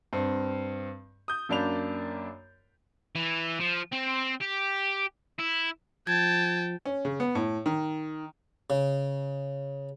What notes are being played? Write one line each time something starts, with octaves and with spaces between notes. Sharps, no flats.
G2 C4
D#6 G6
F#2 A#3 D4 D5 B5 F7
E3
F3
C4
G4
E4
F3 G5 A5 G#6
C#4
C#3
B3
A2
D#3
C#3